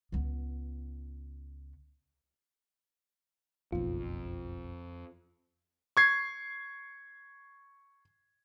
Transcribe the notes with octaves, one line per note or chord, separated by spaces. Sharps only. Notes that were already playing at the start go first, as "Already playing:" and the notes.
C#2 B3
F#1 B1 F2 F4
C#6 G#6 C7